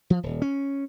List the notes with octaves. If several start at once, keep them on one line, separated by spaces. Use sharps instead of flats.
F3
D#1
C#4